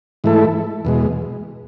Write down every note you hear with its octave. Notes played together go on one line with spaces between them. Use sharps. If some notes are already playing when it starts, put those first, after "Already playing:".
G#2 E3 A3 E4 A4
E2 B2 G#3